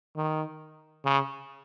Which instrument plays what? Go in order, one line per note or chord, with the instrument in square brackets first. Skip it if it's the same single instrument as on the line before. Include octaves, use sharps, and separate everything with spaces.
[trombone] D#3
C#3